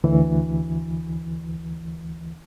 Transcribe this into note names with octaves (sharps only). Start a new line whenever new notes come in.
D2 E3